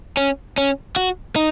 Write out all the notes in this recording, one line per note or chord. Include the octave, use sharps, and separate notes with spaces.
C#4
C#4
F#4
D#4